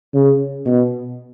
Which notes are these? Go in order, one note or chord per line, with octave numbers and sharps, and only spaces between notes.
C#3
B2